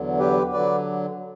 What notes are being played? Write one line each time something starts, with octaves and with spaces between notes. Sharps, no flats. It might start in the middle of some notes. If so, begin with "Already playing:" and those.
Already playing: E2 D3 F#3
G4 B4
D3 F#3 B4 D5